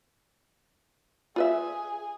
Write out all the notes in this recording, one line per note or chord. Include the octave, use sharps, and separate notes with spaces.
F4 G#4 B4 E5